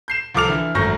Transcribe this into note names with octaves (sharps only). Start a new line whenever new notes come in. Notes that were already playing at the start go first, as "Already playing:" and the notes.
G6 C7 E7
C2 F3 A4 D6 F6 F7
D3 E3
G#1 F#2 A3 C#6 G6 A#6